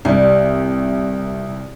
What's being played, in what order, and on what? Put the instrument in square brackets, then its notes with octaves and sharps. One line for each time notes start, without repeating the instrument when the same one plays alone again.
[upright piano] C2 [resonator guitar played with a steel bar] G3